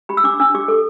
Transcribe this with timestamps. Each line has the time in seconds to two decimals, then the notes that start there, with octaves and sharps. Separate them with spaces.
0.09 G4 B5
0.17 E6
0.24 D4 D6
0.40 D4 E6
0.55 G4 D6
0.68 A4